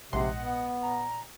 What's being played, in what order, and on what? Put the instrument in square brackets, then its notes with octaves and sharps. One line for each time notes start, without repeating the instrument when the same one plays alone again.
[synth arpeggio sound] A#1 G#2 C6 [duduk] C3 [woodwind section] D#5 F#5
[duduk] B3
[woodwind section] A#2 A#5